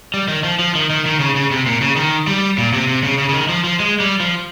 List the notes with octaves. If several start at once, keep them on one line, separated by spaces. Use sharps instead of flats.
G3
D#3
F3
F3
D#3
D#3
D#3
C#3
C#3
C3
A#2
C#3
D#3
G3
A#2
C3
C3
C#3
C#3
C#3
D#3
F3
F3
G#3
G3
F3